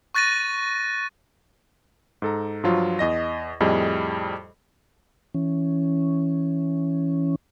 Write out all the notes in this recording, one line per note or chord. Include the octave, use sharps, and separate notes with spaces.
C#6 F#6 A6 A#6 D#7
G#2 A4 A#5
G2 F3 F#3 F4
E2 D#5 A#6
F2 A2 G3 G#4 D#5
E3 C#4